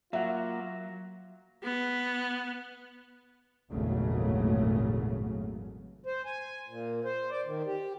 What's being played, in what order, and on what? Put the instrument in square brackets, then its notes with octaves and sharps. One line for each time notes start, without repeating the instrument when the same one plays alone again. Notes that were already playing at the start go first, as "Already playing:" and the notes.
[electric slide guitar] F#3 [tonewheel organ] A#3 [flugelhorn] F4 [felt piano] E5 F#5
[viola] B3
[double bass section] G#1 E2 A#2 C#3 F#3 A3
[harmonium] C5
G#5
A#2
C5
D5
D#3
G4